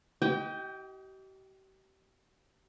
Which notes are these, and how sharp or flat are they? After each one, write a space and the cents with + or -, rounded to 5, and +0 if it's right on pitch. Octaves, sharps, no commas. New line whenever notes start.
G4 -40 D#5 +20 G5 +5